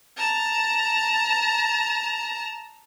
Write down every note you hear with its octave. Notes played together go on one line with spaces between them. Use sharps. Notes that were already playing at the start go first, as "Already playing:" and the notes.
A5 A#5